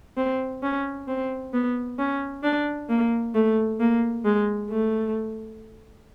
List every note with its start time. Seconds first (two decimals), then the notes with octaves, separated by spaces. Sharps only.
0.17 C4
0.63 C#4
1.08 C4
1.53 B3
1.99 C#4
2.43 D4
2.89 A#3
3.35 A3
3.80 A#3
4.25 G#3
4.70 A3